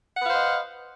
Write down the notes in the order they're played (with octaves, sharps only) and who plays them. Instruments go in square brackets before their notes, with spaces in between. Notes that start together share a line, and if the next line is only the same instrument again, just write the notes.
[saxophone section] F#5
B4
F5
C5
D#5